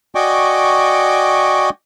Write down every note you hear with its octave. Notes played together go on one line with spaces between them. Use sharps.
F#4 D5 D#5 G5 G#5 C#6